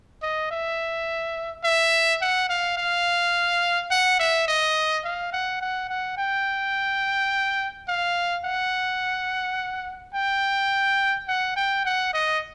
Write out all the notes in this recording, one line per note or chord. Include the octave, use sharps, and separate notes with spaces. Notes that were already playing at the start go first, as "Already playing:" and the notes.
D#5
E5
E5
F#5
F5
F5
F#5
E5
D#5
F5
F#5
F#5
F#5
G5
F5
F#5
G5
F#5
G5
F#5
D#5